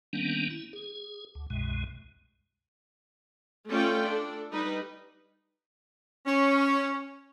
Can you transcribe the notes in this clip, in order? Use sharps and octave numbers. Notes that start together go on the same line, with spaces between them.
D#3 G3 A#3 B3 C#4 D4
E4
G#4
D2
C2 F#2 B2 G#3
A3 C#4 F4 A4 D5 G5
D4 A4
G3 D#4 B4
C#4